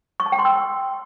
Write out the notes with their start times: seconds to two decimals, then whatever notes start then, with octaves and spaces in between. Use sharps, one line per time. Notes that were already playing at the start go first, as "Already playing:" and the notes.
0.20 C#6
0.26 A5
0.32 G5
0.39 C6
0.45 E6